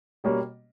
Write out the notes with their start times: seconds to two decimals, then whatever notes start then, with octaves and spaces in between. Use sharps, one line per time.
0.24 B2 G3 A#3 C#4